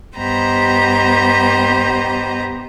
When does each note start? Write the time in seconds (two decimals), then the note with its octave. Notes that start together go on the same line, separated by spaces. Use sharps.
0.16 G2 B3 G4 C5 D#5 A#5